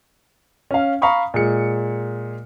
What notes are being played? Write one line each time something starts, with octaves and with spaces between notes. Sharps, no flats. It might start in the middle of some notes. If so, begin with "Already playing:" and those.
C#4 F5
F5 A#5 B5 C#6 D#6
A#2 G#3 C#7